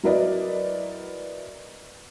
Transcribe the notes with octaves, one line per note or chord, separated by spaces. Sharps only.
F#3 E4 A#4 B4 D5 D#5